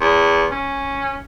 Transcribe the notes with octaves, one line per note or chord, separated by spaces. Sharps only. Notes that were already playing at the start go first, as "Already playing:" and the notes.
E2
C#4